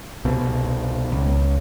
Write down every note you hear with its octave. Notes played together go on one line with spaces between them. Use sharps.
C2 B2
C#2